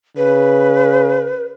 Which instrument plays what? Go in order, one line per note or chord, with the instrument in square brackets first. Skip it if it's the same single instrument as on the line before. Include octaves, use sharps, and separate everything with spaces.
[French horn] C#3 [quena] B4